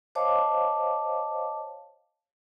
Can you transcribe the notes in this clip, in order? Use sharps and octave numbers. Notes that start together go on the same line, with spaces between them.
C5 C#5 D#5 F5 A5 D6